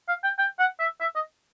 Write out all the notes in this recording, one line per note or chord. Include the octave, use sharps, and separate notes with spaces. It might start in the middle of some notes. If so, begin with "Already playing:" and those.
F5
G5
G5
F#5
E5
E5
D#5